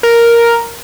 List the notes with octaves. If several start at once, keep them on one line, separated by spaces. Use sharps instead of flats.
A#4